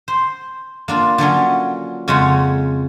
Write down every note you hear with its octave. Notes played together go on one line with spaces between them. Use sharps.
C5
A#3 D4 F4
D3 F3 F#3 C#4
F2 C#3 G#3 C#4 C#5 F#5